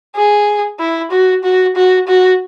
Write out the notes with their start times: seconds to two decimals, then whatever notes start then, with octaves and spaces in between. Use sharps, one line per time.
0.15 G#4
0.79 E4
1.11 F#4
1.43 F#4
1.75 F#4
2.07 F#4